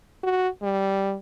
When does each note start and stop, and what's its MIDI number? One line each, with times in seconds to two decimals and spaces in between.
0.24 0.49 66
0.62 1.16 55